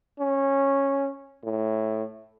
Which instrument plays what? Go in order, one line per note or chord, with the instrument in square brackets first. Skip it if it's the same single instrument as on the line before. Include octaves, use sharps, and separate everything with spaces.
[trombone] C#4
A2